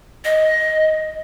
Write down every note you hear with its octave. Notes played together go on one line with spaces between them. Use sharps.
D#5